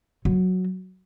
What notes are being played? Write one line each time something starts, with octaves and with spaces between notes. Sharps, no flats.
F#3